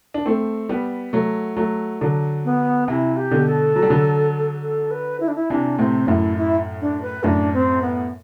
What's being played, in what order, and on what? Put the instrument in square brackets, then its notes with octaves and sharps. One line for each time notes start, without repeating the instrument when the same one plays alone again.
[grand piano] D4
A3 C4
G3 B3
F#3 A3
F#3 A3
D3 F#3
[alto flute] B3
[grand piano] C3 E3 [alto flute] E4
[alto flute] G4
[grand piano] B2 D3
[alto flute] A4
[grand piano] F#3
G3
D3 F#3
[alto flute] A4
B4
E4
D4
E4
[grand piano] C3 E3 [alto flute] D4
[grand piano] A2 C3 [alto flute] C4
[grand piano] F#2 A2 [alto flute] E4
[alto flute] E4
D4
B4
[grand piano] F#2 A2 [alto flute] D4
[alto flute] C4
B3